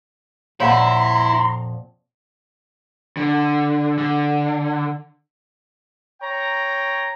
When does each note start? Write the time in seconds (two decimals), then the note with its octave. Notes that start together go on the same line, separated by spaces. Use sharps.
0.60 F2 A#2 E4 C#5 F5 F#5 A#5 C6
3.17 D3
3.98 D3
6.20 C#5 G5 A#5